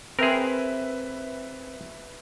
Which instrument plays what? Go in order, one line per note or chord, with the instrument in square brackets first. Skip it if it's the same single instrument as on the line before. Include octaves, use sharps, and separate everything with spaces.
[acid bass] C4 [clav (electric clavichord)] G#4 A#4 [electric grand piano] B4 E5